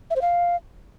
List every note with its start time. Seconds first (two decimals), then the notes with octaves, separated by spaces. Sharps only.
0.10 E5
0.16 C5
0.21 F5